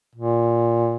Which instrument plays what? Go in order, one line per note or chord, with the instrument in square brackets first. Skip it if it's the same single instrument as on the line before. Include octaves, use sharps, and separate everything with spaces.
[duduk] A#2